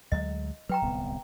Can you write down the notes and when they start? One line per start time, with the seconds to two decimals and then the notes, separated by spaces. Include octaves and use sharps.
0.12 D2 F#3 G#3 D#5
0.69 F#3 B4 G5 A#5
0.82 D1 C2 B3